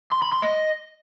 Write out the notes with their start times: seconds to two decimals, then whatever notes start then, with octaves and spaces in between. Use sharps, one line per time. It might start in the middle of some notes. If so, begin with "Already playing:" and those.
0.12 C6
0.22 B5
0.33 C6
0.43 D#5